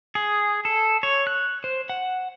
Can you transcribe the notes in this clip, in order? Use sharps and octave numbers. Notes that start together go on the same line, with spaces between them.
G#4
A4
C#5
F#6
C5
F#5